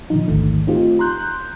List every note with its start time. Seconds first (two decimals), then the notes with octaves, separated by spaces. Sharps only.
0.10 A#2 D3 D#3 F3 D#4
0.28 A1 D#2 G#2 D3 D#3 A3
0.67 A3 C4 D#4 F4 G4
0.99 A#5 C6 F#6 G6